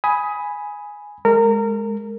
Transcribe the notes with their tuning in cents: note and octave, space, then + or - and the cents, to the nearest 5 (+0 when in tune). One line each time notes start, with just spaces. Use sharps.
G#5 +0 B5 +0 D#6 +20
G#3 +0 A#4 -25